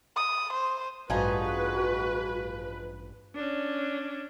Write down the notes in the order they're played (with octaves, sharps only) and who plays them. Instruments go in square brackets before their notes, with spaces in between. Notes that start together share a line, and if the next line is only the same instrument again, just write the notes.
[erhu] D#6
C5
[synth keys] A1 G2 [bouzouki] F3 D#4 G#4 [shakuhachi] F#4 [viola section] B4
[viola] C#4 D4